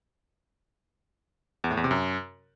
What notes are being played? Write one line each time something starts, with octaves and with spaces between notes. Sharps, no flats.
E2
A2
E2
C3
F#2